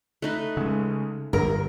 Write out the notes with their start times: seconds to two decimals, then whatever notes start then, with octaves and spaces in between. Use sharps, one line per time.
0.22 A3 D#4 B4
0.57 C#3 G#3
1.33 G1 A#4